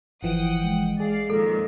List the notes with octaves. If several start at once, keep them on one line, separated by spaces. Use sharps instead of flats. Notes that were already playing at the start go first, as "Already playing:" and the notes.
G1 E3 F3 F#5 G5 D#6
G#3
G#4 D5 F5 C7
F2 A#2 D#3 A4